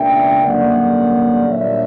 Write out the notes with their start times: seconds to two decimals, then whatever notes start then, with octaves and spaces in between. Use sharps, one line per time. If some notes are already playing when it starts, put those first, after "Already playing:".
Already playing: C#2 B2 A#3 D4 E5 G5
0.44 G2 D3 F#3 A#3 C#4 D5 F#5
1.49 A#2 G3 A#3 D4 C#5 E5